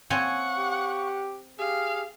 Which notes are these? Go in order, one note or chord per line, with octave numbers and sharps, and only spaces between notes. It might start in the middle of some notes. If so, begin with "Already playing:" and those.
A#3 C4 C#5 F5 F#5 G#5 C#6
G4
G4 G#4 F5